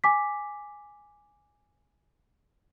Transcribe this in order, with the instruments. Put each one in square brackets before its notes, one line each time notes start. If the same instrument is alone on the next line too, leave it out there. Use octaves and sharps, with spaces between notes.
[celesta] G#5 D6 B6